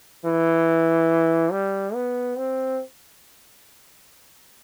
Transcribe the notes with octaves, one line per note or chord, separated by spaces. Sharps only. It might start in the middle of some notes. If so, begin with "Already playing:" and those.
E3
G3
B3
C4